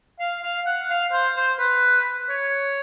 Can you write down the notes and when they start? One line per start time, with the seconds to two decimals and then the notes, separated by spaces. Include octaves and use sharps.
0.20 F5
0.43 F5
0.66 F#5
0.90 F5
1.12 C5
1.37 C5
1.59 B4
2.30 C#5